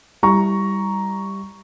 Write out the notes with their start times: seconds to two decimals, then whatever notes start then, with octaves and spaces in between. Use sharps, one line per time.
0.23 G3 E4 A#5 C#6